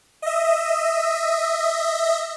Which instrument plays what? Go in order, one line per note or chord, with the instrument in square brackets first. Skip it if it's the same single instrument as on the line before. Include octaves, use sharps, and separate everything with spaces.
[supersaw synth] D#5 E5